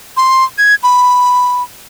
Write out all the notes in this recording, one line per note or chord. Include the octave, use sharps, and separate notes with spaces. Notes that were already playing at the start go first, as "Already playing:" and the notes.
C6
G#6
B5